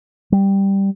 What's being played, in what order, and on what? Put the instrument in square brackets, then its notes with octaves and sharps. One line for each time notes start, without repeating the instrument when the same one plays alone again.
[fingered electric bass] G3